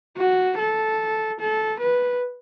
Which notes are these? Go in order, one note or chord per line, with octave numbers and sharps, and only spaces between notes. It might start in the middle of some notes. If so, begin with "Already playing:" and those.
F#4
A4
A4
B4